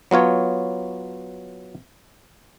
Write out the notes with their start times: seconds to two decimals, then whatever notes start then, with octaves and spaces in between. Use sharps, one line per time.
0.11 F#3 B3 F4 C#5